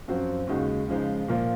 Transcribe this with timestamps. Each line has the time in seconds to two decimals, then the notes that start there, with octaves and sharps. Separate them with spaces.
0.08 F#2 F3 C4 F#4
0.47 D#2 C#3 G#3 D#4 F#4
0.89 C#3 F3 G#3 D#4
1.28 A#2 F3 A#3 F4